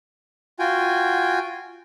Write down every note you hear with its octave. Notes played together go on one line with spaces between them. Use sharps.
F4 F#4 G5 G#5